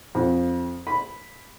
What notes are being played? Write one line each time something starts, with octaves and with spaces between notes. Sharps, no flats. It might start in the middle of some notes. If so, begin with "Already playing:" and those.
F2
B5